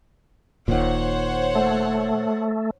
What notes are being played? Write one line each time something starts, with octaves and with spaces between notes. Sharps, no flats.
D#1 A#2 D#3 C5 C#5 F#5
A3